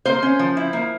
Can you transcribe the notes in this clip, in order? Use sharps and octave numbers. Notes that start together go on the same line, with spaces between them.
A#3 C5
C#4
F3
E4
A#3